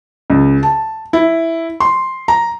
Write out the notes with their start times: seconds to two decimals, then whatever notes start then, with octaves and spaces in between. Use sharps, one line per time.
0.30 C#2
0.63 A5
1.13 E4
1.80 C6
2.28 A#5